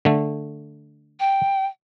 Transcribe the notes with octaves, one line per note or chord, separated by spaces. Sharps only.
D3 A3
G5